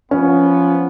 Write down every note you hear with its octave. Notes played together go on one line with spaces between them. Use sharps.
F3 B3 C#4